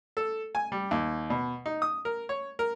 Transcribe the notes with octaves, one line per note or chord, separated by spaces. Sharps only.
A4
G#5
G3
D#2
B2
D#4
D#6
A#4
C#5
A#4